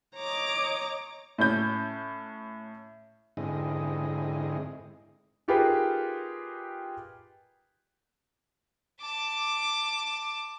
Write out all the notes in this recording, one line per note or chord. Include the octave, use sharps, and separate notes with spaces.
C#5 D#5 A#5 D6
A2 C#4 G6
G#2 D3 C4 E4 G#4 D#5
D#4 F4 G4 G#4 A#4 B4
A5 D6